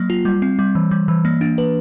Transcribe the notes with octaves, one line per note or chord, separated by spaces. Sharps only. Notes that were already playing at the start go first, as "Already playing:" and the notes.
Already playing: F#3 A#3
F4
G3
C4
G3
E3
G3
E3
A#3
D4
B4